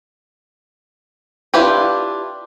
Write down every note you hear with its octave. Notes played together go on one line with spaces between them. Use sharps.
D4 E4 F4 G4 B4